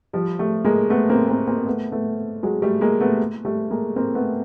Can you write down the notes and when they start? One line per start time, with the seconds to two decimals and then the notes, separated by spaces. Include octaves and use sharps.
0.13 F3 G3
0.39 G3 A3
0.65 G#3 A#3
0.90 A3 B3
1.10 A#3 C4
1.29 A#3 C4
1.47 A#3 C4
1.67 A3 B3
1.92 A3 B3
2.43 F#3 G#3
2.62 G3 A3
2.81 G#3 A#3
3.00 A3 B3
3.45 G3 A3
3.70 G#3 A#3
3.96 A#3 C4
4.15 A3 B3